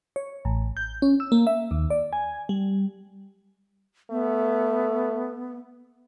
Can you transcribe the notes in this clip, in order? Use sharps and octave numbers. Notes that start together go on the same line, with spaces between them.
C#5
A1
G6
C#4
E6
A#3
E5
D#2
D5
G#5
G3
A3 B3